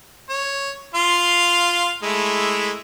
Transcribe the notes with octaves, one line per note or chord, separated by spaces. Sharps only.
C#5
F4 F5 C6
G#3 A3 E4